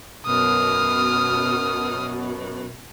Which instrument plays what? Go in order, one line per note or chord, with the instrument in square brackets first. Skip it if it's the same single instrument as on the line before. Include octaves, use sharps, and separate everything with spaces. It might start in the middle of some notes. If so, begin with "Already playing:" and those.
[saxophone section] F#2 B2 [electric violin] D#6 F6